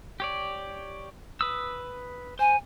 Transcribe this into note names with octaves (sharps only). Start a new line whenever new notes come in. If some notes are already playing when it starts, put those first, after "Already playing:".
G4 C#5 D5
B4 D#6 E6
C5 G#5